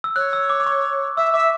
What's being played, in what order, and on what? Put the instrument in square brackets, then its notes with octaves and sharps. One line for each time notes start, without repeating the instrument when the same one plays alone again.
[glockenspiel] E6
[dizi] C#5 [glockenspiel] F#6
[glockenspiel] E6
D6
D6
C#6
[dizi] E5 [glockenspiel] E6
[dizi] E5 [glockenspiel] D6